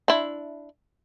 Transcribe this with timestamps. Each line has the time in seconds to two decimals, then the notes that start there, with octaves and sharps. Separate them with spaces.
0.08 D4 E4